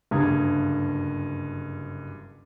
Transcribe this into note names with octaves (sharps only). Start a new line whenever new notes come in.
F#1 D2 G2 A#5 D#6 G#6